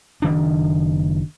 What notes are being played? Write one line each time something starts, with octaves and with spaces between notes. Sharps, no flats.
F#1 D#3 D4